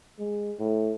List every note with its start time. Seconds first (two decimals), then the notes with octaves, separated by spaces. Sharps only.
0.19 G#3
0.59 A2